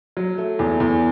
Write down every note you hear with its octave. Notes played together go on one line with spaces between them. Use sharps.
F#3
A3
E2
E2